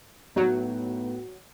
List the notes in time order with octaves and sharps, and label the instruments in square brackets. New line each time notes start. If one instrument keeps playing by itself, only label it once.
[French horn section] A2 B3 [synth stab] F#3 [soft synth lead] D#4